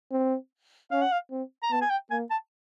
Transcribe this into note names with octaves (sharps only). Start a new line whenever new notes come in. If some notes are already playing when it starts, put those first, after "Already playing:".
C4
C#4 F5
F#5
F5
C4
A#5
B3 A5
G#5
G5
A#3 G#5
A5